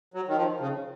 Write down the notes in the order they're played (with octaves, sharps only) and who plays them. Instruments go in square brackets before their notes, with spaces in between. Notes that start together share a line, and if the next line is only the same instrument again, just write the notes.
[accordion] F#3
D#3
F3
C#3